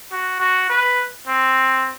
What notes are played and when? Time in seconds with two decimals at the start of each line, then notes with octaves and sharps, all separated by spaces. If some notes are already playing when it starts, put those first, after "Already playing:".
0.12 F#4
0.40 F#4
0.70 B4
1.27 C4